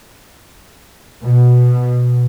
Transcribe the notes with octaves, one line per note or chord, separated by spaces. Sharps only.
B2